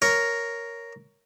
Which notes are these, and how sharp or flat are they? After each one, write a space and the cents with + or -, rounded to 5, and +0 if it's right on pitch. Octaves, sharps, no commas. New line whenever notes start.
A#4 +0 C#5 +10